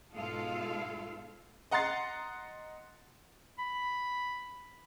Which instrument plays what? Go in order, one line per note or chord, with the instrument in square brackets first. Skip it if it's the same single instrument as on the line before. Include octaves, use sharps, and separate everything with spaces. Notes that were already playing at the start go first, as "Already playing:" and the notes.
[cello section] G#2 B2 G#3 F4 A4 F5
[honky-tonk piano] D#5 F#5 A#5 C6 A6 C7
[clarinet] B5